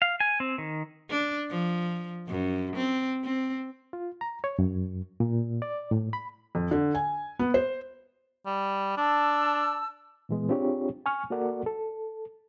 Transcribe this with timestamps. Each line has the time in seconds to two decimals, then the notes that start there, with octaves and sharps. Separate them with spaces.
0.02 F5
0.20 G#5
0.40 C4
0.58 D#3
1.10 D4
1.50 F3
2.28 F#2
2.76 C4
3.24 C4
3.93 F4
4.21 A#5
4.44 C#5
4.59 F#2
5.20 A#2
5.62 D5
5.91 A2
6.13 B5
6.55 F2
6.71 D3
6.95 G#5
7.39 B3
7.54 C5
8.46 G3
8.97 D4 A5 E6
10.29 A#2 E3 G#3 B3
10.49 C4 D4 F4 G4 G#4 C#5
11.06 G#5 C#6 F6
11.30 A#3 F#4 A4 A#4 D5 F#5
11.66 A4